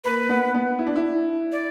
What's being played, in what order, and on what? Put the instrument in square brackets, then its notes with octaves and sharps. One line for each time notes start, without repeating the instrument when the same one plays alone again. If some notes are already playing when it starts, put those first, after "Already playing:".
[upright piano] A#3 [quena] B4
[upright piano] B3
B3
E4
D4
E4
[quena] D5